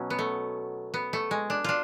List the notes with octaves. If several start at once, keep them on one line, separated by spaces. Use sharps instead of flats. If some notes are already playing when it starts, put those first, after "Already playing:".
Already playing: B2 F#3 C#4
B3
A3
B3
A3
G#3
D4
D4 F4